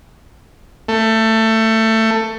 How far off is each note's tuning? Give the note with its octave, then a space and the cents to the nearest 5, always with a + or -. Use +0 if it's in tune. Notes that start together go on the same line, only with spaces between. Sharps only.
A3 +20